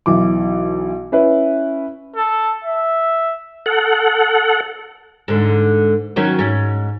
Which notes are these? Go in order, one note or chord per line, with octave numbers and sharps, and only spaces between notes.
B1 E3 D6
C#4 E4 B4
A4
E5
A4 F#5
G#2 D3
D#3 F#3 C#4
G#2 C#4